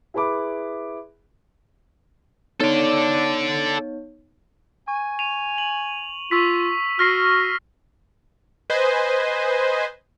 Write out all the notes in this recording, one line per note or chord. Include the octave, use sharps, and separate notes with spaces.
E4 G#4 B4 B5 D6
B3 D#4 A4 C#5 D5
G#5 C#6
D#7 F7
F#7
F4 C#6 E6 B6
F#4 F6 A#6 C7
B4 C5 D#5 G#5